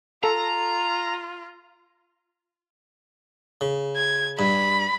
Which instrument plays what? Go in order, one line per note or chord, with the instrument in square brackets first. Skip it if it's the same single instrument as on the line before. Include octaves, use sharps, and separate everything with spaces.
[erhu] F4 [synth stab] A4 [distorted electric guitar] A#5
[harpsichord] C#3
[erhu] G#6
[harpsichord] G2 [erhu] B5